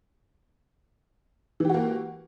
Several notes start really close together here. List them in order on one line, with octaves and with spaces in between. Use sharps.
E3 G4 F#4 A#3